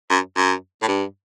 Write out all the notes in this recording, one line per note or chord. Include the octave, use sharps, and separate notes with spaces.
F#2
F#2
A2
G2